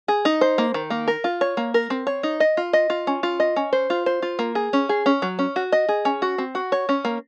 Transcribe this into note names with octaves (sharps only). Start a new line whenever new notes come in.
G#4
D#4
C5
A#3
D#3
A#3
A#4
F4
C#5
A#3
A#4
C4
C#5
D#4
D#5
F4
D#5
F4
C#4
F4
D#5
C#4
C5
F4
C5
F4
A#3
G#4
C#4
G#4
C#4
F#3
C#4
F#4
D#5
G#4
C#4
F#4
C4
F#4
C#5
C#4
A#3